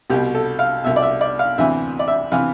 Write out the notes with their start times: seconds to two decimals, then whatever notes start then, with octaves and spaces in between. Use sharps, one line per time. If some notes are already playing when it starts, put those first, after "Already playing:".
0.10 C2 B2 G4
0.35 A4
0.59 F5
0.83 C2 B2 E5
0.96 D5
1.02 E5
1.21 D5
1.39 F5
1.58 D2 C3 E3 E5
1.99 D5
2.08 E5
2.32 C3 E3 F5